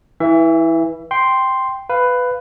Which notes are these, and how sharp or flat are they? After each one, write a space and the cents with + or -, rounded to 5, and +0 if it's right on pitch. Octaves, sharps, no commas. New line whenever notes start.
E3 -15 E5 +25
G5 +0 C6 +0
B4 +10 F5 +0